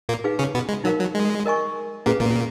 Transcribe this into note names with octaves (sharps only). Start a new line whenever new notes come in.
A#2 A#3
D#4 G#4 B4 F5
C#3 C#4
B2 B3
G#3
F#3 D#4 A#4 F5
F#3
G#3
A#4 D#5 G#5 C#6
A#2 A#3 C#4 G#4 B4 F5
A#2 A#3